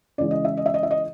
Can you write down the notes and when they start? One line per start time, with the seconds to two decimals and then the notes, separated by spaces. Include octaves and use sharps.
0.18 C#3 E3 G#3 D5
0.31 D#5
0.45 E5
0.57 D#5
0.66 E5
0.74 D#5
0.83 E5
0.91 D#5